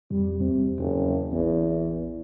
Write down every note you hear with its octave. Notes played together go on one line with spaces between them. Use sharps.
F2 G3
E2 C3
F#1 E2
A1 E2